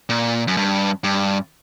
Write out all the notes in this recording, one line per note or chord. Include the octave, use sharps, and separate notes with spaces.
A#2
F#2
G2
G2